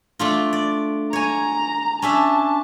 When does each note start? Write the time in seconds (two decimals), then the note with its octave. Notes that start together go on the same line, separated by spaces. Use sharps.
0.19 A3 D4 F4
0.53 D5
1.13 C#5 G#5 A#5
2.02 C#4 D4 E5 A5